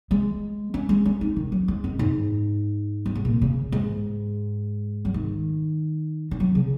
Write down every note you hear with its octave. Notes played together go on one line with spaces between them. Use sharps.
G#3
C#4
G#3
C#4
D#4
D#3
F#3
G#3
F#2
G#2
F#2
G#2
A#2
C#3
G#2
F#3
D#3
D#3
F#3
C#3